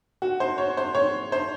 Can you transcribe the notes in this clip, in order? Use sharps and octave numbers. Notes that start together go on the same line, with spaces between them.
F#4
C5
C#5
C5
C#5
C5